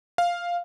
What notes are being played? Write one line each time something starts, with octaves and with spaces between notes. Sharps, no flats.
F5